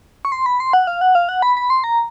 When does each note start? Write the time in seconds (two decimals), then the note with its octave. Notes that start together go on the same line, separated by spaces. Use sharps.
0.25 C#6
0.32 C6
0.46 B5
0.60 C6
0.73 F#5
0.87 F5
1.01 F#5
1.15 F5
1.29 F#5
1.42 B5
1.57 B5
1.70 C6
1.84 A#5